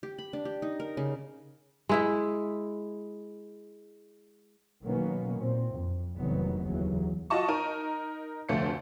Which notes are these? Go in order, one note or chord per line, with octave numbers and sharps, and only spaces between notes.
G4
B5
D4
G4
D#4
A#4
C#3
G#3 E4 E5
B2 D#3 F#3 A#3 B3 C#4
A#2 C4
F2
F1 C2 F#2 D#3 F#3 B3
D#2 C#3 E3 F#3
F4 F#4 D#5 A5 C#6
D#4 A#4 D#7
F1 D2 F3 A3 C#5 C#7